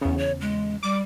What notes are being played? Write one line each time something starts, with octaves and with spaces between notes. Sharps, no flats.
E2 C#3 B3
C#5
G#3
G3 D6